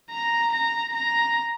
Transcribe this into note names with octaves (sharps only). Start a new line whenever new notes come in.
A#5
A#5
A#5